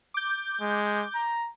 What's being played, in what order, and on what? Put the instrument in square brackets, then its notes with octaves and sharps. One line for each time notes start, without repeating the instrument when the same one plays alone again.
[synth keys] D6 G6
[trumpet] G#3
A#5